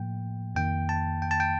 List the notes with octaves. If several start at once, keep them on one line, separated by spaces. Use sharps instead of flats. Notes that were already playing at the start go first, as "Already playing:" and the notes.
Already playing: A2 F3 A#3 G5
F2 D#3 A#3 G5
A5
G5
A5
G5